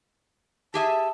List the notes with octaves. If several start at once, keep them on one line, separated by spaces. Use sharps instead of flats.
G4 G#4 E5 A5